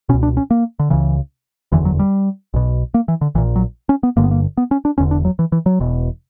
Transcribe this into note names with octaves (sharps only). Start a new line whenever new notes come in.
C#2 B2 C#4
D4
C#4
A#3
D3
C#2 C#3 E3
F#1 E2 D3 E3
F#3
G3
B1 B2
A#3
E3
D3
A#1 A#2 E3
F#3
C#4
B3
G1 G2 D3 A#3
B3
A#3
B3
C#4
D4
E1 E2 D3 C#4
D4
F#3
E3
E3
F#3
E1 E2 B2